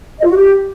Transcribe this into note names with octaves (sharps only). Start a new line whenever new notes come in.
D#5
F4
F#4
G4